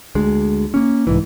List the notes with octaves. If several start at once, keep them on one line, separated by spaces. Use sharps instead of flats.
D2 G#3
A#3 C#4
C2 G#2 E3